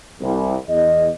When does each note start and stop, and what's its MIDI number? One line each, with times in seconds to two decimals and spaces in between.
0.21 0.54 36
0.68 1.08 40
0.68 1.08 75